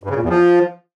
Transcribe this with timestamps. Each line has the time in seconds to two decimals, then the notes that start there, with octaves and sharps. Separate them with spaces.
0.03 G2
0.10 C#3
0.16 A#2
0.23 E2
0.29 F3